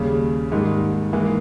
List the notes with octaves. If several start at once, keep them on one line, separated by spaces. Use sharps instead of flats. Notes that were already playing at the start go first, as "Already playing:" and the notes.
Already playing: D#2 C#3 G3
G#2 D#3 G3 A#3
G#2 E3 A#3